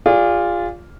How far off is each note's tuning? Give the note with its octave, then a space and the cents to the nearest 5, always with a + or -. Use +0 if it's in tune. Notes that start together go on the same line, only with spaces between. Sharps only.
F4 +0 G#4 -35 D5 -20